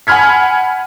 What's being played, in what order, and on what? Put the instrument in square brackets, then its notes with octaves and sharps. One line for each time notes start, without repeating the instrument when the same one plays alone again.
[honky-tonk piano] F#5 G#5 B5 F6 G#6 B6